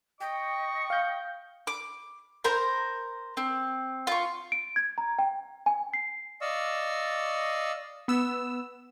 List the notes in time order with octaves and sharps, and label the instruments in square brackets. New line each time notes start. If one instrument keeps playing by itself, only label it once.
[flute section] D#5 D#6 [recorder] G5 [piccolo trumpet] C#6
[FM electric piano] F5 G6
[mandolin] D6
A#4 C5 A#5
C4
F4 C#6
[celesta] D7
G#6
A#5
G5
G#5
C7
[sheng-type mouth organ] D5 D#5 F5 C#6 E6
[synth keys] B3 E6